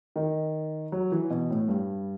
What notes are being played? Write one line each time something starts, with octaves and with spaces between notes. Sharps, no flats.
D#3
F#3
E3
B2
A2
G2